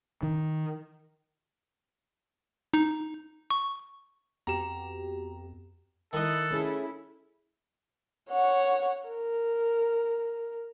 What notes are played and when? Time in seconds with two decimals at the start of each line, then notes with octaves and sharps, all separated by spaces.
0.23 D#3
2.74 D#4
3.50 C#6
4.47 F2 B3 F#4 G4 A#5 E7
6.13 D#3 E4 A4 D#5 F#6
6.51 A3 C#4 E4 G#4
8.30 C#5 F#5
9.08 A#4